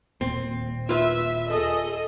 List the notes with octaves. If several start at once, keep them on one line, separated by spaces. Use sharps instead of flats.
D#1 A#2 C4
F4 B4 E5
G#4 A4 D#5